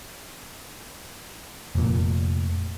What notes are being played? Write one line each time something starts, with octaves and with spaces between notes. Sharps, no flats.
F1 A#2